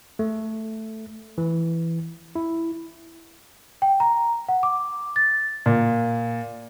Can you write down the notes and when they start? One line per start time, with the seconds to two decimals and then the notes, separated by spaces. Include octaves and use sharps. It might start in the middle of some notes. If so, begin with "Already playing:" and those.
0.19 A3
1.38 E3
2.35 E4
3.82 G5
4.00 A#5
4.49 F#5
4.63 D6
5.16 A6
5.66 A#2